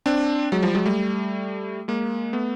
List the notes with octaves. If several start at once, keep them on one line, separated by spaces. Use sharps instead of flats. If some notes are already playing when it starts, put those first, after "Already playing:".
C4 D4
F#3 G#3
F3 G3
F#3 G#3
G3 A3
G#3 A#3
A3 B3